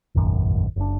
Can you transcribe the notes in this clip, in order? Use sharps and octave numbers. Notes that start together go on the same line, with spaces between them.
E1 A1 F#2 D#3
F#1 D4